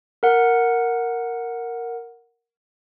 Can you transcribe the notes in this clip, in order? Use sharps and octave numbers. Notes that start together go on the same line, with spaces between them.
A#4 F#5